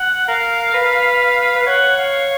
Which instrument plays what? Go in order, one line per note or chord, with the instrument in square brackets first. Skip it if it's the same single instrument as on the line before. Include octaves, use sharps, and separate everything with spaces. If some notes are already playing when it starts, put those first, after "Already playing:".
Already playing: [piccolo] F#5
[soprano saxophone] A#4 [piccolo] F5
[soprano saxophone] B4
B4
[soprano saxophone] C#5 [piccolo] F#5
[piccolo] F5